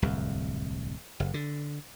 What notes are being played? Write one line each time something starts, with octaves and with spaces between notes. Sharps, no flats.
D1 C2 F2
F#1
D3